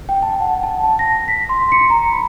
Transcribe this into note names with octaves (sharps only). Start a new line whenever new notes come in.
G5
A5
F#5
A5
A5
A#6
B6
C6
C#7
A#5
B5